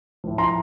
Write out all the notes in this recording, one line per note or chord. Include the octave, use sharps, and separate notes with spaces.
A2 F3
A#5 C6